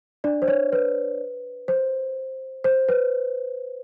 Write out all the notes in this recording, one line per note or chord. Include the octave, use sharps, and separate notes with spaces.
D4 D5
C5
C#5
B4
C5
C5
B4